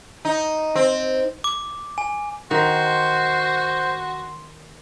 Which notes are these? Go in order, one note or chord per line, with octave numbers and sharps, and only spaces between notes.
D#4
C4
D6
G#5
D#3 F#4 C5 C6